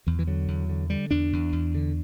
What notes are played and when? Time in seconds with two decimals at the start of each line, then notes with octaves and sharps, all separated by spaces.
0.07 E2 E3
0.19 E3
0.27 D3 F#3
0.48 E2
0.69 D3
0.90 D3 G3
1.11 E2 D4
1.33 E2
1.52 E2
1.75 D3